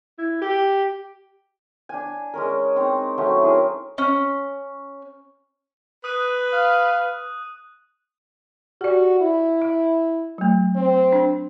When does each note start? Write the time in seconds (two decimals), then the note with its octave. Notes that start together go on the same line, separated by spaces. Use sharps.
0.18 E4
0.41 G4
1.89 D4 G#5
2.34 G#3 C#4 A#4
2.76 C4 D#4 C#5 D#6
3.18 F#3 A3 C4 C#4
3.42 E4 G#4 A#4
3.98 C#4
6.04 B4 D#6 F#6 D#7
6.53 F5
8.81 F#4 G4 D5
9.20 E4
9.62 E5
10.38 F#3 A3
10.75 C4
11.13 D4